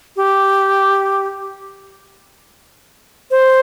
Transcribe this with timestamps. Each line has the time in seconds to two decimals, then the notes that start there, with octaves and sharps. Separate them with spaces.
0.16 G4
3.31 C5